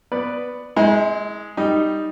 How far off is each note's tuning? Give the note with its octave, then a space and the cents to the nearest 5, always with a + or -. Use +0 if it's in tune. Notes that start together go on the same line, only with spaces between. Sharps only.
B3 +5 B4 +0 D5 +0
G#3 +0 E4 -40
G3 +0 D#4 +0